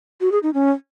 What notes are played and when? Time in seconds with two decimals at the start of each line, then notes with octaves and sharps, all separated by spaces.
0.21 F#4
0.32 G#4
0.43 D#4
0.54 C#4